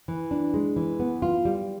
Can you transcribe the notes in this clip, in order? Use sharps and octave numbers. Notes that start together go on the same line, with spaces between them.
E3
D4
G#3
E3
B3
F4
G3